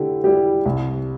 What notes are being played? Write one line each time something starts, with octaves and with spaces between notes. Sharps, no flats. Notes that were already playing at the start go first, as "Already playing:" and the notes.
Already playing: D3 E4 G4
G3 E4 G4
C2